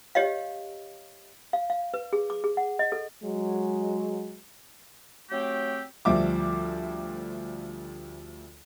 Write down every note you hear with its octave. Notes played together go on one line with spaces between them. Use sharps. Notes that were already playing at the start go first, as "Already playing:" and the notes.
G4 C#5 D#5 F5
F5
F5
B4
G#4
D6
G#4
F#5
D#5
A4
F#3 G#3
F#3 A3 C4 G4
D2 F3 G3 E5 D6